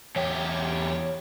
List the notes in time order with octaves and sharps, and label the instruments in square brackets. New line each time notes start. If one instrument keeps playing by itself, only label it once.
[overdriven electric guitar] E2 G4 [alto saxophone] C#5